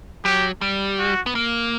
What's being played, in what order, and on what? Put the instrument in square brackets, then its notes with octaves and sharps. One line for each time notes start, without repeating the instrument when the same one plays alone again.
[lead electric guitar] F#3 [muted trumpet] G4
[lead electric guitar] G3
[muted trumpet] F#4
[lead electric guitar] B3
A#3